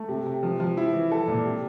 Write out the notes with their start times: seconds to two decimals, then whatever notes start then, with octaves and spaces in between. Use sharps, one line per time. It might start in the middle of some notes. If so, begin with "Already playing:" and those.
Already playing: A3
0.08 C3
0.26 C3
0.43 F3
0.60 F3
0.77 E4
0.93 E3
1.11 A4
1.28 A#2
1.45 C3